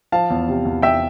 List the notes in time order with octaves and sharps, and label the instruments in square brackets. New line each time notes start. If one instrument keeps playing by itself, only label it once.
[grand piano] F3 F5 A5
E2
C3
E2
E2 E5 G5